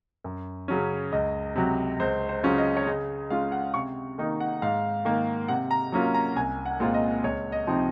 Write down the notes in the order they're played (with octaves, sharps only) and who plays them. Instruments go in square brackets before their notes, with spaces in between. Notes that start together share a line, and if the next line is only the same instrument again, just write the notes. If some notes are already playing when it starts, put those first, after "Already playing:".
[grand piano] F#2
C#3 F#3 C#4
C#2 D#5
C3 F#3
C#2 C5
C5
C#3 F#3 C#4 F4
D#5
C#5
C#3 D#5
G#3 C#4 F4 F5
F#5
C3 C#6
D#3 A#3 D#4
F#5
G#2 F5
D#3 A#3
C3 F#5
A#5
F#3 A#3 C#4 F4
A#5
C2 G#5
F#5
A#2 G#3 C4 F4
D#5
C#2 C#5
D#5
C3 F3 C4 D#4